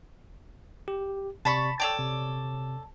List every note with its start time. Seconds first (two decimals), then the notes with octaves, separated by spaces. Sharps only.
0.88 G4
1.45 C3 D5 A5 B5 C#6 A6
1.80 A4 C#5 D5 G5 A5
1.99 C3